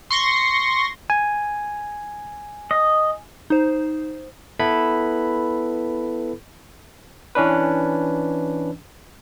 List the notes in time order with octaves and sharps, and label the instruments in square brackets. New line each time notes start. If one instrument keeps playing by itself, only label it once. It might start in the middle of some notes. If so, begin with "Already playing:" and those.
[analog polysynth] C6 C#6 A#6
[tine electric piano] G#5
[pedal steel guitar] D#5
[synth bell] D#4 C5
[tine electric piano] B3 E4 A4 B4 B5
E3 C#4 D4 B4